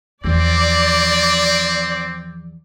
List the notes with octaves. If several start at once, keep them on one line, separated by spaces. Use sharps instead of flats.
E2 F3 C4 D5